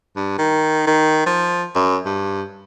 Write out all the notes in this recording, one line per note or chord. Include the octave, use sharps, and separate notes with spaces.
G2
D#3
D#3
F3
F#2
G2